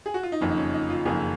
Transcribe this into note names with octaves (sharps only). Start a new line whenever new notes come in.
G#4
F#4
F4
D#4
F#1 F2 D#3 C#4
D#4
C#4
D#4
F4
F#1 F2 D#3 G#4